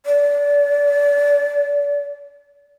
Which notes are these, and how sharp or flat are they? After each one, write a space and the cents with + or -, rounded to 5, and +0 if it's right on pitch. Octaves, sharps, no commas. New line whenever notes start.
D5 -30